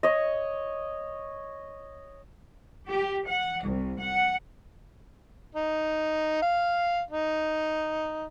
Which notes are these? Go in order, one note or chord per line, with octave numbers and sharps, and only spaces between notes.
C#5 D#5
G4
F#5
C2
F#5
D#4
F5
D#4